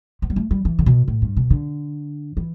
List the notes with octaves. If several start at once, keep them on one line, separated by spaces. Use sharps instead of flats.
B3
G3
A3
G3
E3
D3
B2
A2
G2
B2
D3
E3